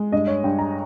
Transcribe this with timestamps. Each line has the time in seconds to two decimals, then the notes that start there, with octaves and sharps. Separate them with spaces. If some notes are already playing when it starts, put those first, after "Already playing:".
Already playing: G#3
0.12 G2 D#5
0.27 C#5
0.44 G2 G5
0.59 A#5